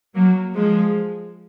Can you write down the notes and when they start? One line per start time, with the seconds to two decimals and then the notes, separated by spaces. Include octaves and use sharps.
0.15 F#3 A#3
0.55 F3 G#3